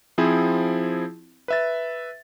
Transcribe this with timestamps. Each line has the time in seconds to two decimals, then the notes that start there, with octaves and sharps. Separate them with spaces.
0.18 F3 C4 E4 G#4
1.48 B4 E5 A6